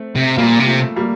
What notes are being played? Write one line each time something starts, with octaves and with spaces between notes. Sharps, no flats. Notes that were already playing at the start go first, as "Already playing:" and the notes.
Already playing: A3 C4
C3
A#2 G3 A#3
C3
F3 A3
G3 A#3